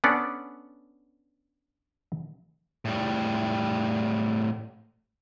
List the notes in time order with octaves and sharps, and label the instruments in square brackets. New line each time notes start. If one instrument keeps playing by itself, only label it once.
[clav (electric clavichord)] B3 C#4 D4 A4 D5 F#5
[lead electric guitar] A2 G3